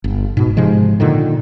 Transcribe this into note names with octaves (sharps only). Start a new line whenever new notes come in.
G1
G#2 B2
G#2 C3 F3 G#3
A#2 D3 D#3